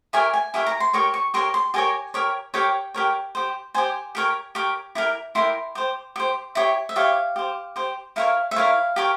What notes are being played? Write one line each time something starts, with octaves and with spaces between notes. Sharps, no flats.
E4 G4 A#4 C#5 G#5
G#5
E4 G4 A#4 C#5 G#5
A#5
C6
G4 A#4 C#5 C#6
C#6
G4 A#4 C#5 C6
C6
G4 A#4 C#5 G#5
G4 A#4 C#5
G4 A#4 C#5 G5
G4 A#4 C#5
G4 C5
G4 C5 G#5
G4 A#4 C#5
G4 A#4 C#5
E4 G4 A#4
E4 G4 A#4 C6
G4 C5
G4 C5
E4 G4 C#5
E5
E4 G4 C#5 F5
G4 C5
G4 C5
E4 A#4 C#5 F5
E5
E4 A#4 C#5 F5
G4 A#4 C#5